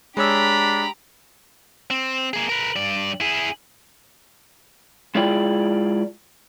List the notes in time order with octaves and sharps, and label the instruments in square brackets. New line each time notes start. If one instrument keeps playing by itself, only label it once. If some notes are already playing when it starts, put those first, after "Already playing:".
[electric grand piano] G#3 C#5 E6 [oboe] D4 [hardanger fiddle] G4 A#5 [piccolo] B5
[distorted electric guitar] C4
A#3 G#4
A#4 B4
G2 D5
E4 G#4
[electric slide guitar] G#3 E4 F4 G#4 D5 G5